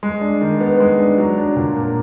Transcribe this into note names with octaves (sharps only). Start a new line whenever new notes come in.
G#3
D4
D#3
B3
G#3
D4
F#3
D4
A#2
A#3